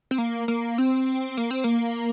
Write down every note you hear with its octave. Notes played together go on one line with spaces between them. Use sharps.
C4
A#3
A#3
C4
A#3
C4
A#3